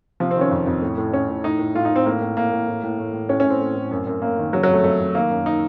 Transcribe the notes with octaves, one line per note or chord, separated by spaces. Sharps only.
C3 F3
C4
D#3
C#4
F2
F2
A2
A2
A2 C#4
A2
A2 D#4
A2
A2 F4
D#4
A2
C4
A2 A#3
A2
A2 A#3
A2
A2
A2
A2
A2
A2 C#4
C#4
A2
C4
A2
A2
F#2
F#2
F#2 A#3
D#3
C#3 F#3
F#3
F2
A3
F2 A3
F2
D#3 A#3
F#2
D#4